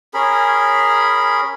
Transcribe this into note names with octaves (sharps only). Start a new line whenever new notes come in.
C#4 G#4 A#4 B5